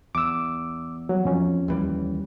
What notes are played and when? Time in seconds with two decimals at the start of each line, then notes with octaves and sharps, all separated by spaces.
0.15 E2 D6 E6
1.09 F#3
1.25 F2 C#4
1.68 D#2 E3 G3